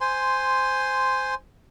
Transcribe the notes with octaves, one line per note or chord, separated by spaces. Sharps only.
C5 G#5 C6